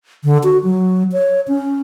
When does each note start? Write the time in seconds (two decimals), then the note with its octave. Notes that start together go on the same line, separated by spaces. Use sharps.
0.24 D3
0.44 F#4
0.64 F#3
1.12 C#5
1.48 C#4